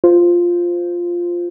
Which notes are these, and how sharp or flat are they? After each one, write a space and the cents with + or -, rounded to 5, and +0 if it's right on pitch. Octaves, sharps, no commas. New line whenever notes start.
F4 +0 C5 -10